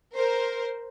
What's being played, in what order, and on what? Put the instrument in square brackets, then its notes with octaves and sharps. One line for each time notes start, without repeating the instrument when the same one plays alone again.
[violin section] A#4 C5